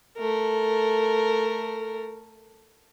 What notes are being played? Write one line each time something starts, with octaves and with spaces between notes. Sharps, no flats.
A3 A#4